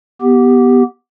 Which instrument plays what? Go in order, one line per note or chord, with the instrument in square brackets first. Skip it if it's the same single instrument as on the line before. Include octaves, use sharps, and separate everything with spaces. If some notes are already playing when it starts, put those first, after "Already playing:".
[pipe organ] B3 G4